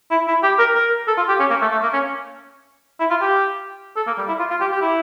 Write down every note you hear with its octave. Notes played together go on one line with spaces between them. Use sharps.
E4
E4
G4
A#4
A#4
A4
F4
G4
C#4
A#3
A3
A3
A#3
C#4
E4
F4
G4
A4
A#3
G3
E4
F4
F4
G4
G4
E4